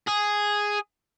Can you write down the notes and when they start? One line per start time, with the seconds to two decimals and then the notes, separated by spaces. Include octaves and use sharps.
0.08 G#4